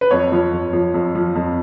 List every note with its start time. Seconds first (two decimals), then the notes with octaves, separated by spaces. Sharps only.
0.01 B4
0.11 F2 C#5
0.32 F3
0.52 F2
0.73 F3
0.94 F2
1.15 F3
1.35 F2